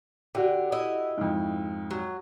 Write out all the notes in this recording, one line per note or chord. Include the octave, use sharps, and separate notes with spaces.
D3 F#4 G4
E4 D#5
F2 G#2
F#3